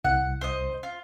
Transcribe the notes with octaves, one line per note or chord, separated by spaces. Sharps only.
C2 F#5
C5 D#5
F4